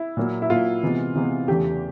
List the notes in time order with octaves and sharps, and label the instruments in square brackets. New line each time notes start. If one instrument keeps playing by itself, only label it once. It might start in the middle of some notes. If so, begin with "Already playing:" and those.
Already playing: [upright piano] E4
[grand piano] A#2 F#3 A#3
[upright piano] E4
[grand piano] A#2 F#3 A#3 [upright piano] F4
[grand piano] C3 E3 G#3 B3
C3 E3 G#3 B3
[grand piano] E2 C#3 E3 A3 [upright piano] G4